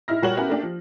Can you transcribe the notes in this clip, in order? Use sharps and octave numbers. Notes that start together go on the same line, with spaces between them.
A2 D#4 E4 F6 A#6
A#2 G3 F#4 A#4 C#5 F#7
B3 C#4 E4 F#4 G4 A#4
A3 A#3 D4 G4
F3